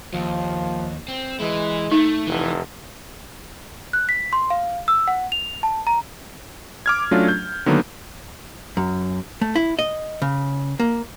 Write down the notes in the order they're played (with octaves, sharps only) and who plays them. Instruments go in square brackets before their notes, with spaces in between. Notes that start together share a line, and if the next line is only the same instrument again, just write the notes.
[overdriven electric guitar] D#2 [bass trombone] F3
[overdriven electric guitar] C4
[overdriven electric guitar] E3 E4 [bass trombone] G#3
[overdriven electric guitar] A3 [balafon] D#4
[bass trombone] F1 [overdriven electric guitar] E3
[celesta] F#6
B6
C6
F5
E6
F#5
F7
A5
A#5
[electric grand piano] D6 F6 G#6
F#3 A3 C#4 D4 F4
G6
D3 D#3 F#3 A#3 B3
[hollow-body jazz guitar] F#2
A3
E4
D#5
C#3
A#3